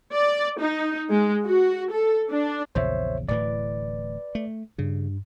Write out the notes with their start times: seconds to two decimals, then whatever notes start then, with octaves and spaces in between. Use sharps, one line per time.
0.13 D5
0.59 D#4
1.10 G#3
1.46 F#4
1.93 A4
2.30 D4
2.75 A#1 E2 C#3 C5 C#5 E5
3.29 D1 A2 E3 B4 D5
4.35 A3
4.79 G2 C#3